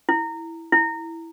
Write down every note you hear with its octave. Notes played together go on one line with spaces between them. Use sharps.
E4
E4